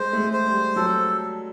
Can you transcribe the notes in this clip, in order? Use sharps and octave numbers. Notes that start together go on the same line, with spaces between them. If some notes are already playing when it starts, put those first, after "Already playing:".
Already playing: G#3 C5
A3
G#3
C5
G3
F#3 A4